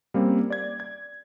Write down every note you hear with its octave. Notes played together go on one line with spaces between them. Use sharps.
G3 A#3 C4 C#4
D5 G#6
G#6